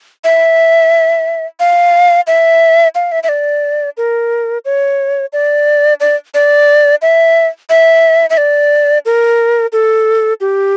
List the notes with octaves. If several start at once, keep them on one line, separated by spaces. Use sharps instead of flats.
E5
F5
E5
F5
E5
E5
D5
A#4
C#5
D5
D5
D5
E5
E5
E5
D5
A#4
A4
G4